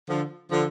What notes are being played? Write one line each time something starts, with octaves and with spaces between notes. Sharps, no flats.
D3 F3
D3 F3